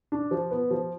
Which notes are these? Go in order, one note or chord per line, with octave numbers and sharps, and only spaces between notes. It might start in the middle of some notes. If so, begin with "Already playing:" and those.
D4
F3
B3
F3